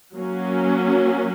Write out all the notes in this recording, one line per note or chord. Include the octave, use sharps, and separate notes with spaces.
F#3 A#3 C#4